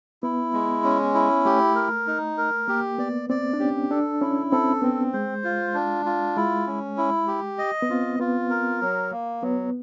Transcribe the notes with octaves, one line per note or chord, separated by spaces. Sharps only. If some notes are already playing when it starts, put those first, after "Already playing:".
B3 E4
G#3
C#4
E4
A3 G4
A#4
D#4
A#4
A#3 G4
B3 D5
C4 D5
D4
C#4 G4
D4 A4
C#4 E4
C4 A4
B3 C4
G#3 C5
F4
D4
F4
G#3 E4
C#4
E4
G4
D#5
B3
C4 F4
B3 F4
A#4
F#3
A#3
F#3 B3